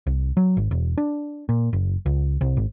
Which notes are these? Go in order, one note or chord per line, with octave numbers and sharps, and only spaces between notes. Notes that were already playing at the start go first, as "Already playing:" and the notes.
C2
F#3
G#1
E1
D4
A#2
F#1
C#2
C2
G#1